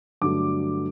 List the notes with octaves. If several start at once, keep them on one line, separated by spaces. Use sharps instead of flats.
G2 D3 F#3 A3 D6